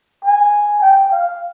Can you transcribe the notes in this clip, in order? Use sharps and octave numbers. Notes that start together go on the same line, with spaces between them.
G#5
G5
F5